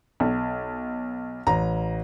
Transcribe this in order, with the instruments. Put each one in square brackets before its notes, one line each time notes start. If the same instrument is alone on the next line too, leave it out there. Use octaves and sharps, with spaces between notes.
[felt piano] B1
[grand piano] A1 [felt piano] A#5